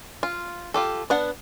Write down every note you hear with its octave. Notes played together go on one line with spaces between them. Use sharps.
F4
F4 G4 A4
B3 D4 F#5